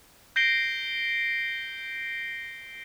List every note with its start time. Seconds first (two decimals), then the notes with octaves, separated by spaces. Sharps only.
0.36 G6 A#6 C7 D7 G7